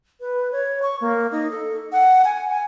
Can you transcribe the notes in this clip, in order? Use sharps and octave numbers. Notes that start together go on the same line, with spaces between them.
B4
C#5
C#6
A#3
D#4
A4
F#5
G#5
G#5